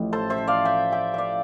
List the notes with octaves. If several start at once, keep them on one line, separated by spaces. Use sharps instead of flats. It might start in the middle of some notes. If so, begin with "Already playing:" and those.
Already playing: A1 A2 F3 A3 E4
A4 C5
C5 E5
D5 F5
E5 G5
E5 G5
D5 E5 F5